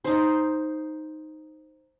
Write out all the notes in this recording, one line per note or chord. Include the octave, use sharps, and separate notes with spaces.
D#4 C5